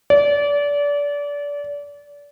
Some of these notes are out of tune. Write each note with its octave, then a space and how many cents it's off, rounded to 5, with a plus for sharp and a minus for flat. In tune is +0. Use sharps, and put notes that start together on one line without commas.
D5 -30